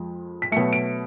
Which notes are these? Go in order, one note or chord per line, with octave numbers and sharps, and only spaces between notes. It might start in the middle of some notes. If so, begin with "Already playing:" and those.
Already playing: F2 F3 G#3
B6
B2 F#3 A3 C#7
D7